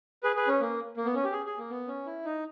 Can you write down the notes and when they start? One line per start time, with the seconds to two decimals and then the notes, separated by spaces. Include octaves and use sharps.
0.23 G#4 B4
0.36 G#4 B4
0.48 C#4
0.61 A#3
0.97 A#3
1.05 B3
1.15 C#4
1.24 G4
1.32 G#4
1.46 G#4
1.58 A#3
1.70 B3
1.87 C#4
2.06 E4
2.25 D#4